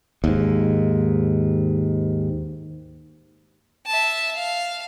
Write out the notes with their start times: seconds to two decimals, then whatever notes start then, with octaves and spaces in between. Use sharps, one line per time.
0.24 D#2 G#2
3.87 E5 A5
4.35 F5